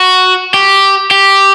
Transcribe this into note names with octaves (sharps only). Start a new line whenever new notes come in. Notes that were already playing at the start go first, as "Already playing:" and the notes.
Already playing: F#4
G4
G4